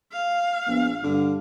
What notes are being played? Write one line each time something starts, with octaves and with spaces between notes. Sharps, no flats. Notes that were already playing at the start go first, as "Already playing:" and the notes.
F5
A#1 B3
G2 D3